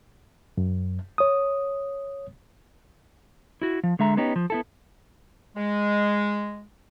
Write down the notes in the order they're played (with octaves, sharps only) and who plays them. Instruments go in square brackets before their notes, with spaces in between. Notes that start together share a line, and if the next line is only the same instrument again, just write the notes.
[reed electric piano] F#2
C#5 D#6
[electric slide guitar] E4 F#4
F3
D3 G#3 E5 A#5
B3 C#4 D#4 G4
F3
B3 E4 A4
[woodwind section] G#3